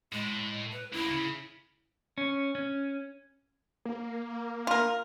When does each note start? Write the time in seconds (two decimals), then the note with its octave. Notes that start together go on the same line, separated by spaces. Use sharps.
0.12 A2 G#3
0.72 B4
0.93 C#2 A#3 E4
1.11 C#3
2.18 C#4
2.55 C#4
3.85 A#3
4.67 F4 A#4